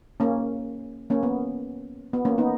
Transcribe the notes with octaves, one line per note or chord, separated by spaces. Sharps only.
A#3 C#4
A#3 C#4
B3
B3
A#3 C#4
B3 D#4